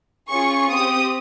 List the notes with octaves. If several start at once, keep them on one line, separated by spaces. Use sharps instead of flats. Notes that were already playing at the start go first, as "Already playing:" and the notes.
C#4 F4 G#4 C#6
C4 G4 D#6